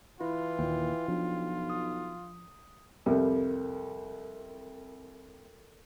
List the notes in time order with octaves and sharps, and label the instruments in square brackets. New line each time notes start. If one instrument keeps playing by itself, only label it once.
[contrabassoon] E3 [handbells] E4 [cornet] F4
[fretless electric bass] D#2 A#2 [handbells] G5
[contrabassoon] B1 [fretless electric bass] F3 D4
[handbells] D#6
[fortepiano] C2 F2 G3 [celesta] A4 A#4